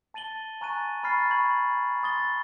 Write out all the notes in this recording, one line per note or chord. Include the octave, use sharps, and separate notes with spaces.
A5 A6 D#7 F#7 G7
G#5 A#5 C#6 F#6 A6 D#7
A#5 B5 C#6 F6 A6 C7
A#5 B5 C#6 G#6 F#7
C6 D#6 A6 G7